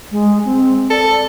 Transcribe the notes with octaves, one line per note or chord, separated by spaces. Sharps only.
G#3
C4
A4 D5